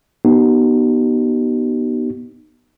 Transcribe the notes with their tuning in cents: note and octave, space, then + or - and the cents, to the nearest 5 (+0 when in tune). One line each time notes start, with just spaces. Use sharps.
B3 -20 D#4 -25 G4 -45